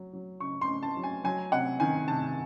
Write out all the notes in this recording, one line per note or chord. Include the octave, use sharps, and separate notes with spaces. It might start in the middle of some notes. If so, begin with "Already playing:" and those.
Already playing: F#3
F#3
C#3 C#6
C6
C#3
A5
F#3
G#5
F#3 G#5
C3 F#5
D#3 G#5
C3 A5